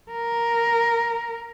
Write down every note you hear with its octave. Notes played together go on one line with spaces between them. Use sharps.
A#4